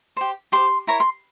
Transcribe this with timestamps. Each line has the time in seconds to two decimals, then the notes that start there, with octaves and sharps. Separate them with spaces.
0.17 G4 C5
0.52 G4 C5 C6
0.87 E4 A#4 C#5 A#5
1.00 C6